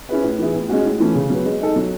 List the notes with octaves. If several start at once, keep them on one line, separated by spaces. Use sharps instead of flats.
C#4 E4 G#4 B4
A2
E3 B3 E4 G#4
A2
G#3 C#4 F#4
A2
E3 A3 C#4
C#3
F#3 B3
G#3
D#4 A4
F#3